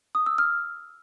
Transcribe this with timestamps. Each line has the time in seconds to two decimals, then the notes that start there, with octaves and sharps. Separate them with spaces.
0.15 D#6
0.26 E6
0.38 F6